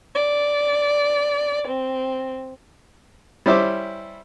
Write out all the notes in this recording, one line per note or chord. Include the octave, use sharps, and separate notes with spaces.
D5
C4
G3 C#4 E4 C5 E5 D6